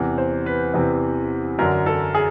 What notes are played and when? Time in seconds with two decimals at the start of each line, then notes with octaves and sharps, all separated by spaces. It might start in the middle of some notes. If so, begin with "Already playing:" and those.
Already playing: E2 C3 E3
0.18 C5
0.46 B4
0.74 E2 C3 E3
1.59 F#2 D3 A#4
1.86 A4
2.15 G#4